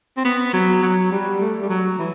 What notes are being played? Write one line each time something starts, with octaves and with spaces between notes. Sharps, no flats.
C4
B3
F#3
F#3
G3
A3
G3
F#3
E3